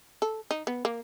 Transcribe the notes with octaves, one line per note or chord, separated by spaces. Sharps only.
A4
D#4
B3
A#3